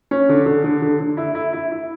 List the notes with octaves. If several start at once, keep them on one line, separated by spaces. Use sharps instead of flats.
C#4
D3
D3
D3
D3
D3
E4
E4
E4
E4